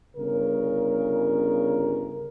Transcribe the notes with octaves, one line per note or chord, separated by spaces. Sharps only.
G1 C#3 A#4